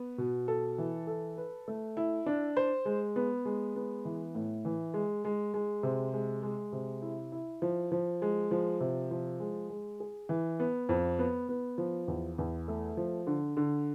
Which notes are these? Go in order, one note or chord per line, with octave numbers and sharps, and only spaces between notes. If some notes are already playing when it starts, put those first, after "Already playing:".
Already playing: B3
B2
A4
E3
A4
B4
A3
E4
D4
C5
G#3
B3
G#3
B3
E3
A2
E3
G#3
G#3
G#3
C3
G#3
G#3
C3
E4
E4
F3
F3
G#3
F3
C3
F3
G#3
G#3
G#4
E3
B3
F2
B3
B3
F3
E2
E2
A3
F3
D3
D3